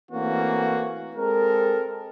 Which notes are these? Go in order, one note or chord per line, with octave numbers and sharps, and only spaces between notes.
E3 A3 A#3 C4 C#4 F#4
G#3 C4 A4 A#4